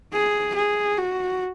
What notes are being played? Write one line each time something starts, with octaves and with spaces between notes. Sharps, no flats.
G#4
G#4
F#4